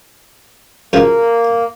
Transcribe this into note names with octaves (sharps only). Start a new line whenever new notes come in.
F#2 C#3 F3 A#3